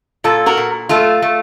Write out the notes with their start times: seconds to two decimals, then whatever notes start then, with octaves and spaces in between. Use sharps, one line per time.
0.24 A#2 F4 A4
0.46 F#4 A#4
0.57 A#2
0.89 A3 F4 A4
1.22 A3